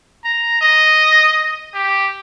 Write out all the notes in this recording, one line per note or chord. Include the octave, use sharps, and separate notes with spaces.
A#5
D#5
G4